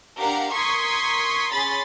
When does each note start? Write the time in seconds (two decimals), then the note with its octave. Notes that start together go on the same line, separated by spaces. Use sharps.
0.17 D4 G4 A#4 F5 F#5 A#5
0.52 A#4 C6 C#6 D#6 G#6 B6
1.52 C#4 G#4 B5 C6 A6 B6